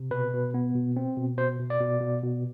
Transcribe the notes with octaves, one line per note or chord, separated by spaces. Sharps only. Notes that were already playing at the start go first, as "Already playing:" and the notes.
Already playing: C3
B2 B4
B2
B3
B2
C4
B2
B2 C5
B2
D5
B2
B2
B2